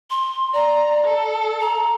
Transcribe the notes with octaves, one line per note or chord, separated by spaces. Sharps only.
C6
D5 A#5
A4
A#5